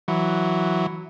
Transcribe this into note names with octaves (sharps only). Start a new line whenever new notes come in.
E3 F#3